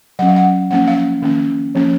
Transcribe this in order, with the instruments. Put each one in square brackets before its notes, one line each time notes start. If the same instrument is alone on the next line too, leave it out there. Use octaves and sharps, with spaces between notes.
[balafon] F#3 C#4 F#5
F5
F#5
F3 A#3 C#4 F#5
F5
D#3 A#3 C#4
F3 A#3 C#4